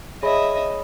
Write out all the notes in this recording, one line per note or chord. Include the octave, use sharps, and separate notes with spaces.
G#4 C#5 D#5 E5 B5